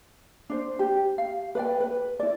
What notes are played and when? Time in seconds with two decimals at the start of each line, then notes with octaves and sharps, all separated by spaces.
0.50 D4 C5
0.79 G4
1.18 F5
1.55 B4 D5 G5
1.80 B4
2.20 E4 D5